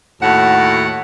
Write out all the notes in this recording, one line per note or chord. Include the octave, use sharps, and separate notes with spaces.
D#2 A2 F#4 F#5